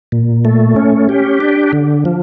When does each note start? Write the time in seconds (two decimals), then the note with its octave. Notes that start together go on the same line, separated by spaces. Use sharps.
0.12 A#2
0.45 A3
0.76 C#4
1.09 G4
1.40 D4
1.73 D3
2.05 F3